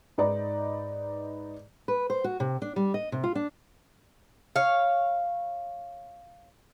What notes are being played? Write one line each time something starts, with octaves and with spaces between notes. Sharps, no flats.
G#2 D#4 B4 D5 A#5
B4
C5
F#4
C3
D4
G3
D#5
C3
F4
D4
C#5 F5